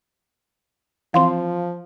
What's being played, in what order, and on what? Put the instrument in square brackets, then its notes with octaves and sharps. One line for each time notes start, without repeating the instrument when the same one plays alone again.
[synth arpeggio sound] E3 C4 [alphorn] F3 [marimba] F5 C6